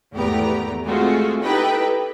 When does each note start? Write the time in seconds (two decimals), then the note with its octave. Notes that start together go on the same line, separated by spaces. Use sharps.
0.13 G#1 E2 A3 B3 G4 A#5
0.86 G#3 A3 C4 F4 F#4 G#4
1.42 D#4 E4 G4 A4 B4 G5